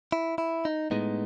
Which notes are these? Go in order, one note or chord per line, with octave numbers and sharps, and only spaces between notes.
E4
E4
D#4
A2 G#3 B3 D#4